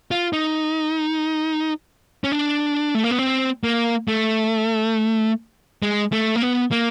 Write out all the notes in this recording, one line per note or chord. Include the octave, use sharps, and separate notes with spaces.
F4
D#4
C#4
D4
A3
A#3
B3
C4
A#3
A3
G#3
A3
A#3
B3
A#3